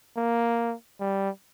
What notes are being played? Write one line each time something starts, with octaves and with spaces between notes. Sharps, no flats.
A#3
G3